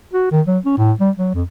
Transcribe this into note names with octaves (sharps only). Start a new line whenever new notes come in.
F#4
D#3
F#3
C#4
A2
G3
F#3
F2